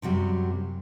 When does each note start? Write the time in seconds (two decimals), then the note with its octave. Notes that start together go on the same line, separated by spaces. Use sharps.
0.02 F#2 C3 F#3 G3